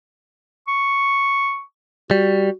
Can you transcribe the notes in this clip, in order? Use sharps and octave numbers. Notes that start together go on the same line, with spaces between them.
C#6
G3 F#4